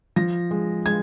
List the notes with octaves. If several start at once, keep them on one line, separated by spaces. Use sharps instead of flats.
F3 A#6
G#3
G#3 G#6